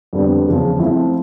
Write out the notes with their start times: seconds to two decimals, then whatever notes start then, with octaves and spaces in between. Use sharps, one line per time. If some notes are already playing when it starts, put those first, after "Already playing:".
0.13 F2 D3 G3 B3
0.46 E2 C#3 F3
0.79 F3 A3 C4 E4